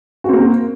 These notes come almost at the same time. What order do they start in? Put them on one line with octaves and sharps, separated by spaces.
F#4 C4 A#3